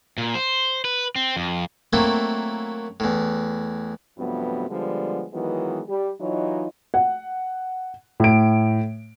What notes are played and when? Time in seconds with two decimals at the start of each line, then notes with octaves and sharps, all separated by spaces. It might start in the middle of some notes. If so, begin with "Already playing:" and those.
0.18 A#2
0.35 C5
0.85 B4
1.16 C4
1.36 F2
1.93 F#3 A3 A#3 C4 E4
3.00 E2 A2
4.19 G2 C3 F3 F#3 A3 B3
4.69 D3 F3 G3 G#3 B3 D4
5.33 D#3 E3 F#3 G#3 B3 F4
5.89 G3 G4
6.19 E3 F#3 D#4 F4 C#5 D#5
6.94 F#5
8.20 A2 D7